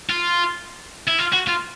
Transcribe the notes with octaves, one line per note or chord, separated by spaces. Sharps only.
F4
E4
F4
F#4
F4